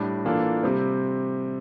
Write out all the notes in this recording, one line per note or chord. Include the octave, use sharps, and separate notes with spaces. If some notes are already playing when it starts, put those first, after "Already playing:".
Already playing: A2 G3 D4
E3 A#3 D4 F4 A4
C3 G3 C4